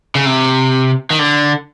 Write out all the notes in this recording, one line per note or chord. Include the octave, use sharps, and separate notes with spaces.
C#3
C3
D#3
D3